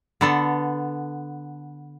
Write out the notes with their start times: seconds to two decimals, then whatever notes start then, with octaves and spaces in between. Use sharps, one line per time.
0.21 D3 B3 A4